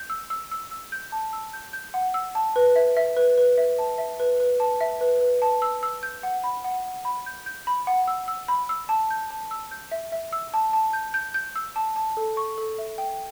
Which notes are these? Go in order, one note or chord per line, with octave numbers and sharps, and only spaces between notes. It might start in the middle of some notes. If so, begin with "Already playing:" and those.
Already playing: G6
E6
E6
E6
E6
G6
A5
E6
G6
G6
F#5
E6
A5
B4
E5
E5
B4
B4
E5
A5
E5
B4
B4
A5
E5
B4
B4
A5
E6
E6
G6
F#5
B5
F#5
F#5
B5
G6
G6
B5
F#5
E6
E6
B5
E6
A5
G6
A5
E6
G6
E5
E5
E6
A5
A5
G6
G6
G6
E6
A5
A5
A4
C#6
A4
E5
G5